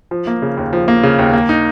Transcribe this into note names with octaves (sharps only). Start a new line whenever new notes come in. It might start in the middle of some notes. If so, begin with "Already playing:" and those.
F3
A#3
C#3
D#2
F3
A#3
C#3
D#2
A#3
D#4